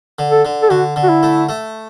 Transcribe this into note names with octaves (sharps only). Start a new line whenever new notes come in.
D3
A4
D3
A4
D3 F#4
D3
F#4
E4
A3
A3